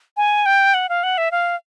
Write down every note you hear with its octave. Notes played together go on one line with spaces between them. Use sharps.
G#5
G5
F#5
F5
F#5
E5
F5